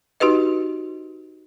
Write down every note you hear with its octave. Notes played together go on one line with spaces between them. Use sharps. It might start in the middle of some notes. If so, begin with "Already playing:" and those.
D#4 F#4 G4 B4 D#5